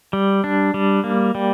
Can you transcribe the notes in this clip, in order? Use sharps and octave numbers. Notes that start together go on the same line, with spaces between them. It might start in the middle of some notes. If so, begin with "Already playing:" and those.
G3
D4
G3
A#3
G3